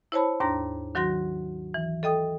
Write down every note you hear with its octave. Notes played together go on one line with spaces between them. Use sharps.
E4 C5 C#5 A5 B5
D#2 G#2 D4 A#5 A#6
D#3 F#3 F#4 C6 A#6
E3
A4 D#5 G5 D#6